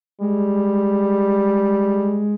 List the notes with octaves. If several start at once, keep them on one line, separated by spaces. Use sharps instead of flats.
G3 G#3